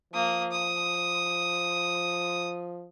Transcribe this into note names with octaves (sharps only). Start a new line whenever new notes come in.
F3 A#3 D#6
D#6